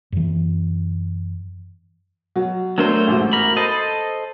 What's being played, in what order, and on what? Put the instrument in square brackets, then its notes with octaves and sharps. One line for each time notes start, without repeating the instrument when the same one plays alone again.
[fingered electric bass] F#2 E3
[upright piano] B2 F#3
[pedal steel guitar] F#3 A3 C5 [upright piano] B3 D4 A#4
[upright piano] A1 G#2 B2
[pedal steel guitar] A#4 B5
[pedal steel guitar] A4 C5 D#5 [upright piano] B5